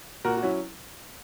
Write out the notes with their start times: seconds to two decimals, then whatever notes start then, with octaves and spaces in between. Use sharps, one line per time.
0.25 A#2 F#4 A#4
0.37 F#4
0.43 F#3 C#4 E4